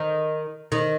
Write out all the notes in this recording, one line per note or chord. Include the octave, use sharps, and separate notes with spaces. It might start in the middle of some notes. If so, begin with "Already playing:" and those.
Already playing: D#3
D#3